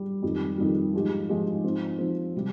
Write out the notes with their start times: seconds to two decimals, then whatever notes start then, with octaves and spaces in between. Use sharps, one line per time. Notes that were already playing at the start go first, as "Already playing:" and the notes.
Already playing: G3
0.22 F2 D#3 G3
0.58 F2 D#3 G3
0.94 G#2 F3 G#3 D#4 G4
1.29 G#2 F3 G#3 D#4 G4
1.64 G#2 F3 C4
1.98 G#2 F3 C4
2.36 C3 G3